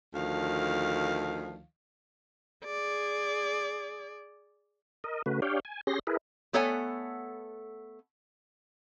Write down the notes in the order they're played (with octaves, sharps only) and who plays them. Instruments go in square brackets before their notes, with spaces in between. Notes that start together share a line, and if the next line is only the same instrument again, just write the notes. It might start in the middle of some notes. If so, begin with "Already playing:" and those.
[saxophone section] D2 D#3 F3 F5
[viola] G#4 D5
[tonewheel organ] A#4 D#5
C#3 A3 F#4 B4
D4 G4 C#5 F5 G5
G#5
C#4 G4 G#4 C6 A#6
E4 G#4 A#4 B4
[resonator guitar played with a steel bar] A3 B3 A4 C#5 F#5 G#5